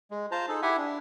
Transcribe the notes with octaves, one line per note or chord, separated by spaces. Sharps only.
G#3
F4 C5 A5 A#5
D#4 G#4 A4
E4 G4 E5 F#5 G#5
D4